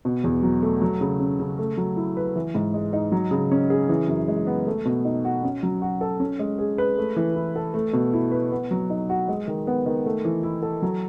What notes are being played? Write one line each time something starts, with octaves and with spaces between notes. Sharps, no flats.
B2
E2
F#3
A3
F#3
C#3
C#4
C#3
A3
F#3
E4
B4
E3
G#2
G#3
D#4
F#3
C#3
C#4
G#4
E3
F#2
G#3
B3
A3
B2
D#4
F#4
C#4
F#3
F#4
A4
C#4
G#3
G#4
B4
A3
E3
E4
A4
A3
B2
E4
B4
B3
F#3
D#4
F#4
G#3
D#3
B3
D#3
A3
E3
E4
A4
F#3